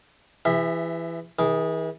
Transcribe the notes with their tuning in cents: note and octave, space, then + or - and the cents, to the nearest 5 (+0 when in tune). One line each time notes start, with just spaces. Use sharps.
E3 +20 G#4 -40 E5 +0
E3 -40 G#4 +0 D6 -25